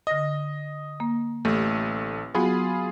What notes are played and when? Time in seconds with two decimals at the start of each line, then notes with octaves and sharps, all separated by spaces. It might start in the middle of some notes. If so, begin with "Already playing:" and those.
0.07 D3 D#5 A#6
1.00 A#3
1.45 A1 A3 G4
2.35 F#3 B3 F4 F#4 G#4 B5